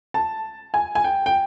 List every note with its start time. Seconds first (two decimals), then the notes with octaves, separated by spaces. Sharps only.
0.14 A5
0.74 G#5
0.95 G#5
1.04 G5
1.26 G5